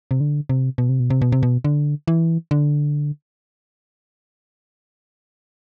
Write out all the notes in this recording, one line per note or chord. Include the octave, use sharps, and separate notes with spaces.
C3
D3
C3
B2
C3
B2
C3
B2
C3
B2
D3
E3
D3